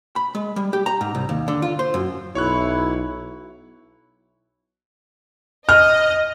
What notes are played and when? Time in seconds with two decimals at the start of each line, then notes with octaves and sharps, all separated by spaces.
0.16 B5
0.35 G#3
0.56 G3
0.73 G4
0.86 A#5
1.01 G#2
1.15 C2
1.29 D#2
1.48 D3
1.62 F4
1.79 C5
1.94 F#2
2.35 B1 E4 C#5 C#6 F#6
5.69 D#5 F6